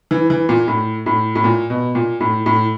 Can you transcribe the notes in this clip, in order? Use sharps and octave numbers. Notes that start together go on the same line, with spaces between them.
E3
E3
A#2
A2
A2
A2
A#2
B2
A#2
A2
A2